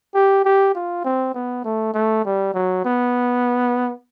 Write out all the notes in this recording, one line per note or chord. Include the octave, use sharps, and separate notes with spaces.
G4
G4
F4
C4
B3
A3
A3
G3
F#3
B3